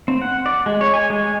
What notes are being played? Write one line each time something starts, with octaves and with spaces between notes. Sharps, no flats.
C4
F#5
D5
G#3
C#5
G#5
G#3
G#5